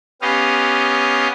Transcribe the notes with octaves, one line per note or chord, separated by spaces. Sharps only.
B3 C#4 G4 D#5 F5